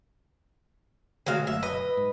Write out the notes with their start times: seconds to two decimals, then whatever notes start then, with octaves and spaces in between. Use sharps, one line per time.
1.26 D3 G#3 A3 F#4 F5
1.47 F#1 E5
1.63 B4 D#5
1.97 G#2